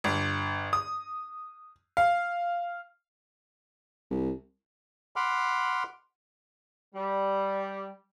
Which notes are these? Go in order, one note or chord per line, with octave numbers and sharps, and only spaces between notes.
G1
D#6
F5
C2
F#5 B5 C6 D6 F6
G3